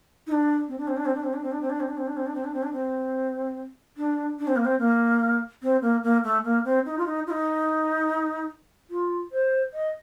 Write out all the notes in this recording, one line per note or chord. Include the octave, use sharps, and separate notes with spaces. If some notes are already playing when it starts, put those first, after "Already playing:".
D#4
D4
C4
D4
C4
D4
C4
D4
C4
D4
C4
D4
C4
D4
C4
D4
C4
D4
C4
D4
C4
D4
C4
D4
C4
D4
D4
C4
A#3
C4
A#3
C4
A#3
A#3
A3
A#3
C4
D#4
F4
D#4
F4
D#4
F4
C5
D#5